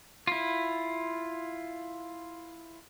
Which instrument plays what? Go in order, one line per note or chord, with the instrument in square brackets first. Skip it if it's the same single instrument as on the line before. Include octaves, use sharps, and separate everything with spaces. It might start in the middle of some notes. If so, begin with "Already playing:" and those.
[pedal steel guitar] E4 F4